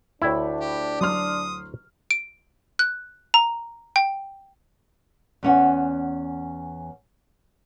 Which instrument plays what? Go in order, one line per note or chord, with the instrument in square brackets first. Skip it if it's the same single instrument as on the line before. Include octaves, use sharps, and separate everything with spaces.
[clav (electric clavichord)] D2 E4 [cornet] D4 [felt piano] C#5 G5 B5
[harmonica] G4
[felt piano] F#3 C6 F6 [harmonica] D#6
[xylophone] D7
F#6
A#5
G5
[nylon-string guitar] E2 C#4 F#5